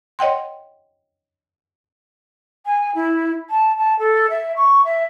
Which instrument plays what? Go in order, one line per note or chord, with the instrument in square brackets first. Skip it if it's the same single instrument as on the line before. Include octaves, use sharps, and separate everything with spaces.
[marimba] C#5 D#5 F#5 G5 C6
[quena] G#5
E4
A5
A5
A4
E5
C#6
E5